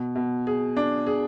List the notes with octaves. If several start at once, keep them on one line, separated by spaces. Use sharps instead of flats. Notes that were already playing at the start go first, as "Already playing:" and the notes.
Already playing: B2
B2
G#4
D4
G#4